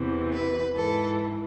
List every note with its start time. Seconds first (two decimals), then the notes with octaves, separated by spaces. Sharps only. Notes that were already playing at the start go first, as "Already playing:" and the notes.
Already playing: E2 C3 E3
0.32 B4
0.75 G#2 E3 A4